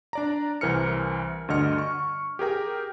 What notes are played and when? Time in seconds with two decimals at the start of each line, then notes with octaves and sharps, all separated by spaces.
0.13 D4 D5 A#5
0.61 C2 E3 A#4 C5 F6 C#7
1.48 D2 G2 D3 D#5 F6 C#7
1.78 C#6
2.39 G4 G#4 A#4 G5